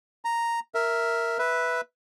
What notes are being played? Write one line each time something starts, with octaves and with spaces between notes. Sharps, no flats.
A#5
A#4 E5
B4 E5